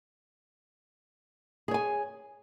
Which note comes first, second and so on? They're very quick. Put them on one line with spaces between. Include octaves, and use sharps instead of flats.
G#4 C#5 G#5